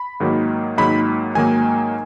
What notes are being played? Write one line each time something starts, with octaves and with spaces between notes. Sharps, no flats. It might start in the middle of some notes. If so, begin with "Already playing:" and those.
Already playing: B5
G#2 D#3 F#3 A#3
G#2 D#3 F#3 A#3 B5
G#2 D#3 F#3 A#3 G#5